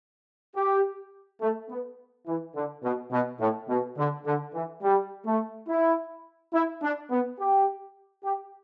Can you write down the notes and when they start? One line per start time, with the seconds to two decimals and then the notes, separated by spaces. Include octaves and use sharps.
0.56 G4
1.42 A3
1.70 B3
2.27 E3
2.55 D3
2.84 B2
3.12 B2
3.40 A2
3.69 B2
3.97 D3
4.26 D3
4.54 E3
4.83 G3
5.26 A3
5.68 E4
6.54 E4
6.83 D4
7.11 B3
7.39 G4
8.24 G4